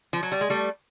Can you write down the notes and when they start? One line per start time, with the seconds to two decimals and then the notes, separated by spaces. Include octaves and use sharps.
0.13 F3
0.23 F#3
0.32 G3
0.41 G#3
0.50 G3 A3